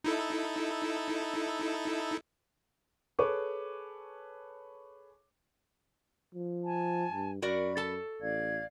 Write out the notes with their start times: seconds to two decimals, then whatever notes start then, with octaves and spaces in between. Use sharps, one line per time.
0.04 D#4 E4 A4
3.19 G#4 A4 B4 C#5 C#6 D6
6.35 F3
6.64 G#5 A5
7.12 G2
7.42 F#2 F#4 A#4 D5 B5
7.77 A4 A5
8.21 A1 D5 F5 G#6